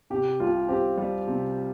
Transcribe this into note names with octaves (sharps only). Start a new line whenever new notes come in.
C3 G4
C2 F4
C4 G4
G3
C3